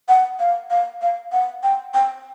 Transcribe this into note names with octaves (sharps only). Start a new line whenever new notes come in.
F#5
F5
F5
F5
F#5
G5
G5